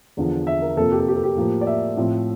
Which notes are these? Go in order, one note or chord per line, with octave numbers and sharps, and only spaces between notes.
E2 D3 F3
E5
A#4
F2 C3 F3 A#3 A4
G4
A4
G4
A4
G4
A2 F3 A#3
D5
E5
A2 F3 C4